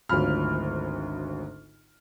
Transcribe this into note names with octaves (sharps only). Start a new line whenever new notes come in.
G#1 D2 F#3 F4 B5 F6